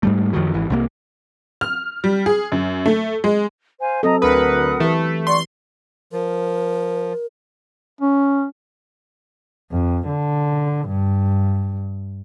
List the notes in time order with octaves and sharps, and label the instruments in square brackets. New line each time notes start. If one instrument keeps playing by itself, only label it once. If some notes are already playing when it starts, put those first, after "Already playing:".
[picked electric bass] G#2 G3 A3
F#2 D#3 F3 F#3
G#1 E3
C2 C3 F#3 A#3
[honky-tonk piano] F6
G3
G#4
F#2
A3
G#3
[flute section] C5 F5 G#5
[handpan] F#3 C4 A4 [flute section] D#5 A#5 D#6
[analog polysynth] D2 B4 [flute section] A#4 F#5 D#6
[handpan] E3 G4 B4 [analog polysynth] A3
[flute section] D5 F#5 C#6 [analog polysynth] C6
[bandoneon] F3 [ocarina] A#4
[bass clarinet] C#4
[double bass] F2
D3
G2